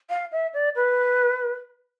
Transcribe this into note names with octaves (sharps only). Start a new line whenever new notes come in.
F5
E5
D5
B4